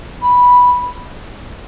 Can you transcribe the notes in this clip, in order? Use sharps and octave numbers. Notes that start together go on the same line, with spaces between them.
B5